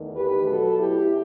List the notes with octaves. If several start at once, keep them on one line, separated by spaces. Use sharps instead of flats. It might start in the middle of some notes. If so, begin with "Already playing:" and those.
Already playing: E2 D#3 A3
G4 B4
B2 F#3 A3 F#4 A4
E4 G4